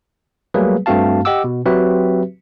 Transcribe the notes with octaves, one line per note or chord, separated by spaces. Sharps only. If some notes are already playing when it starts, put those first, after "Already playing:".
F#3 G3 A3 A#3 G#4 B4
G2 A3 C4 F#4 F5 A5
G4 D#5 F#5 D6 E6
B2
F#3 C4 F#4 G4 B4 E5